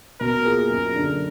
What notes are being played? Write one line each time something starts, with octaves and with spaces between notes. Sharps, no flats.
B2 A#4
A#3 F4 G#4
F#2 A#4
D3 F#3 D4